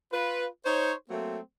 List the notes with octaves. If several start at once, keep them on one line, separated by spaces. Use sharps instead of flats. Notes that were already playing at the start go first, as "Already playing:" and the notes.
F4 B4
D#4 C5 C#5
F#3 A3 A#3 C4